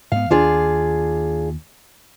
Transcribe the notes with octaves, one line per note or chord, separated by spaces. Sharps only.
G#2 B3 F5
D#2 D4 F4 G#4